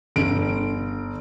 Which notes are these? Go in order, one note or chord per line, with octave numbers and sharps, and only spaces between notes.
G1 D7